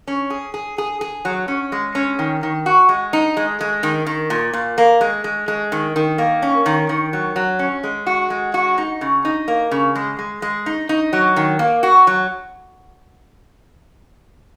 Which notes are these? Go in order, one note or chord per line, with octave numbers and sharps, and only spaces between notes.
C#4
G#4
G#4
G#4
G#4
F#3
C#4
G#3
C#4
D#3
D#3
F#4
G#3
D#4
G#3
G#3
D#3
D#3
A#2
A#2
A#3
G#3
G#3
G#3
D#3
D#3
A#3
C#4
D#3
D#3
F#3
F#3
C#4
G#3
F#4
G#3
F#4
D#4
C#3
D#4
A#3
C#3
G#3
G#3
G#3
D#4
D#4
F#3
D#3
A#3
F#4
F#3